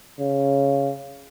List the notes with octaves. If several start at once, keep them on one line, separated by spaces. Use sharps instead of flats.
C#3